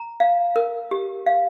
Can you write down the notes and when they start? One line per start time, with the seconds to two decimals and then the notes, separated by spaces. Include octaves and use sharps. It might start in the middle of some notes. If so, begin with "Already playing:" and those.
Already playing: A#5
0.20 F5
0.56 A#4
0.91 G4
1.26 F5